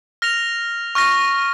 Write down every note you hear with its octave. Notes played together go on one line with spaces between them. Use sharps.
F6 A#6 F7
C#6 F6 A#6